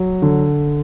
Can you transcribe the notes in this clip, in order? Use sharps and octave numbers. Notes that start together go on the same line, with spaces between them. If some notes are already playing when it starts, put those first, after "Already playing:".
Already playing: F#3
D3